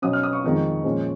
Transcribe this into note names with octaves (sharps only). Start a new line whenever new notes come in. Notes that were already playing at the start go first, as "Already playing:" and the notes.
B2 F#3 C#4 D#6
F6
D#6
C#6
F2 D#3 G#3
A#2 F3 G#3 C#4